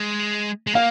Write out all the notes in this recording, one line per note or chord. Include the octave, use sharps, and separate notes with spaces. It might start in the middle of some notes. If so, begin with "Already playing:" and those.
Already playing: G#3
G#3
A#3 F5